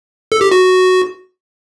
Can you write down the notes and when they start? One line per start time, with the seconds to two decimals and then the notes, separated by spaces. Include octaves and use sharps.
0.32 A4
0.41 G4
0.51 F#4